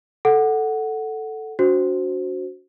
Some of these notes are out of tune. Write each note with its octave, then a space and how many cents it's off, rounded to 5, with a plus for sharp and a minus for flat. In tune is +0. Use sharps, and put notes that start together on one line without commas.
A4 +0 F#5 +0
D4 -40 F#4 +0 C5 +0